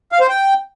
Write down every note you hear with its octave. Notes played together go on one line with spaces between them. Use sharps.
F5
C5
G5